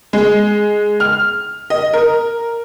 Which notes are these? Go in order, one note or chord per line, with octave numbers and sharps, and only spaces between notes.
G#3
F6
D#5
A#4